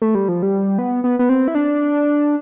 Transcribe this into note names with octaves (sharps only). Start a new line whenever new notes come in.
A3
G3
F3
G3
B3
B3
B3
C4
E4
D4